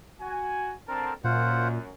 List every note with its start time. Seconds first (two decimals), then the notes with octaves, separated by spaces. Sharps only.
0.20 F#4 G#5
0.88 D3 C4 A#4 A5
1.24 F#2 A#2 F4 C5 F#5